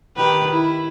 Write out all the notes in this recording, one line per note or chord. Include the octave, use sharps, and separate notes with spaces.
D#3 G4 B4
E4